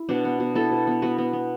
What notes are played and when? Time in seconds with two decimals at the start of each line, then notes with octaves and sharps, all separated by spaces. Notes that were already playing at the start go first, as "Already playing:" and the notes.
Already playing: E4
0.09 B2 D4
0.25 B3
0.40 B2
0.55 B3 E4 A4
0.71 B2
0.87 B3
1.02 B3 F#4 B4
1.18 B3
1.33 B3